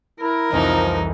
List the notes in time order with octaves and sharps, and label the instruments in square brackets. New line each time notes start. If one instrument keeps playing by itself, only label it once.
[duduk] E4 [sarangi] A#4
[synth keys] C2 F2 E3 [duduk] F3 [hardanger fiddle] D#4